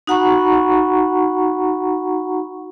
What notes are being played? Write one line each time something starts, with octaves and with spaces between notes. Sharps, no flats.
D#4 F#4 F#5 A#5 B5 C#6